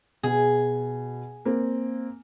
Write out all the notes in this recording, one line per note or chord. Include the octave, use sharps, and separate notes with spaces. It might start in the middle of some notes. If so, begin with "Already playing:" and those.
B2 G#4
A#3 C4